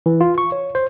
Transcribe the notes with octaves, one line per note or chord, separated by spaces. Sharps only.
E3
F4
C#6
C#5
C5